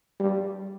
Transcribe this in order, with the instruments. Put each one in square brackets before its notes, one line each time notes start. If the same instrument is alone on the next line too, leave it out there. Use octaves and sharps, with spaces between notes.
[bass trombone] G3